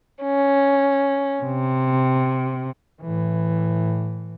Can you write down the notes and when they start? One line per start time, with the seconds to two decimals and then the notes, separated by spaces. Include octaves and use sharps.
0.21 C#4
1.43 C3
3.01 A2 E3